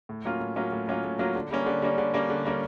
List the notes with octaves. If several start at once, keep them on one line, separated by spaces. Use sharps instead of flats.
A2
F#3 A#3 C#4 F4
A2
F#3 A#3 C#4 F4
A2
F#3 A#3 C#4 F4
A2
F#3 A#3 C#4 F4
D3
G3 A#3 C#4
D3
G3 A#3 C#4
D3
G3 A#3 C#4
D3
G3 A#3 C#4